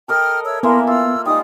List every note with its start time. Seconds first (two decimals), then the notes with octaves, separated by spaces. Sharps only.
0.08 A4 A#4 D#5 G5 F6
0.45 C#5 E5 E6
0.63 E3 A#3 B3 E4 A#4 E5 C6
0.87 F4 E6
1.25 G3 G#3 D#4 D#6